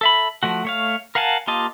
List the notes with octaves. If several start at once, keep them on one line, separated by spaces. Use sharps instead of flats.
A4 E5 B5
F3 A3 F#4
A3 C#5 F5
A#4 F5 F#5 G#5 A5
A#3 F4 G4 D#5 A5